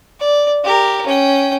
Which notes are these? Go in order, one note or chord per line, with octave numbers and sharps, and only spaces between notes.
D5
G4 A#4
C#4 G5